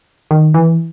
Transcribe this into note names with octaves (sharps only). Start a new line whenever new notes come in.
D#3
E3